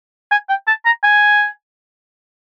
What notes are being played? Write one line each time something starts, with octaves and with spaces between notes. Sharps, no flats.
G#5
G5
A5
A#5
G#5